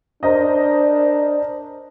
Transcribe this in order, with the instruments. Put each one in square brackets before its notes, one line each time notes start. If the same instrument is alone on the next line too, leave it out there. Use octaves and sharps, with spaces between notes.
[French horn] D4 [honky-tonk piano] A#4 C5 D#5